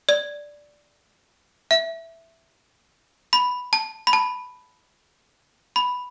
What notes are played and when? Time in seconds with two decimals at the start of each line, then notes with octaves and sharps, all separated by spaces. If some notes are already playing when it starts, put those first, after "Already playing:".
0.09 D5
1.71 E5
3.33 B5
3.73 A5
4.07 B5
4.13 A5
5.76 B5